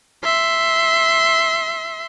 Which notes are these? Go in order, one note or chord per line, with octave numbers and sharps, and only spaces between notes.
E5 C6